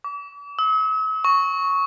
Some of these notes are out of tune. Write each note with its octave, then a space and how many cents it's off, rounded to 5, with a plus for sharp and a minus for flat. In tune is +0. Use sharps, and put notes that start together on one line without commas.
D6 -40
E6 -45
C#6 +0